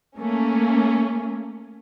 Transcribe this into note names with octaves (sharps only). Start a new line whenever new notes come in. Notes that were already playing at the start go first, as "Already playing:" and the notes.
A3 A#3 C#4